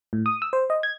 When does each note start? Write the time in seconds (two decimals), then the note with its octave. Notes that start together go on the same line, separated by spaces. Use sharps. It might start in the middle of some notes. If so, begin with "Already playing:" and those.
0.13 A2
0.26 D#6
0.42 E6
0.53 C5
0.70 D#5
0.83 G#6